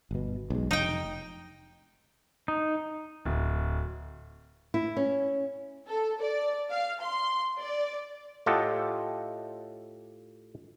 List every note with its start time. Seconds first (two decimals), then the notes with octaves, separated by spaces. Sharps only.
0.11 G1 B2
0.50 B1 G#3
0.71 F1 D#4 G5
2.48 D#4
3.25 D1
4.74 E4
4.97 C#4
5.88 A4
6.22 D5
6.71 F5
7.03 C6
7.59 D5
8.46 A2 F4 G4 A4 D#5 F#5